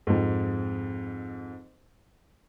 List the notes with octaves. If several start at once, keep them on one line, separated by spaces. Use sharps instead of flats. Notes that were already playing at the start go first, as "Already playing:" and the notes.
F2 G#2